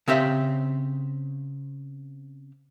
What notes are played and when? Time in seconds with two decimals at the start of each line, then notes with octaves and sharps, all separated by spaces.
0.08 C#3 C4 G4 E5